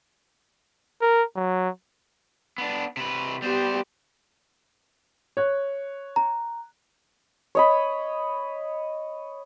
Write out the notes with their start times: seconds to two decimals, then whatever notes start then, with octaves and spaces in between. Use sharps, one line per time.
1.02 A#4
1.36 F#3
2.58 B3 D4
2.97 C3 B4
3.42 G3 B3 G4 C5
5.37 C#5 F#6
6.16 A#5
7.55 C#5 D#5 B5